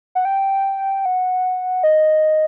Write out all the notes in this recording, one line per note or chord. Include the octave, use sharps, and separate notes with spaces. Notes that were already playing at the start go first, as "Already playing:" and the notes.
F#5
G5
F#5
D#5